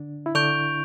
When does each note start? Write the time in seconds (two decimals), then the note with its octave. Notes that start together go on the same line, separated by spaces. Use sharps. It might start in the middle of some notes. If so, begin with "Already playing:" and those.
Already playing: D3 D4
0.26 E4
0.35 D3 D4 C#6 G6 D7 F7